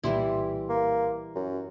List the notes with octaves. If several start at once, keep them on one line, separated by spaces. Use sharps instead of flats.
C2 A#2 E3 G3 E4 C6
A#3
F#2